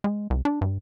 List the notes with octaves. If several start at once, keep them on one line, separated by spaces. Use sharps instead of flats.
G#3
C2
D4
G2